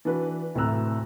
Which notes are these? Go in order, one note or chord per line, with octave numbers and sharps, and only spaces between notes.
E3 D4 F#4 B4
D2 A2 C3 A#5 E6 F#6